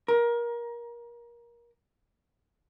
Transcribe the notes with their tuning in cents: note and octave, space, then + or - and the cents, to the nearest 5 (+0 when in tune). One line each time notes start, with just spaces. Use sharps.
A#4 +25